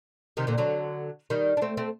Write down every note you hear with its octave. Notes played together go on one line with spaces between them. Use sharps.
C3 D#3
A#2 D3
D3 F#3
D#3 G3
D4
A3 C4
A3 C4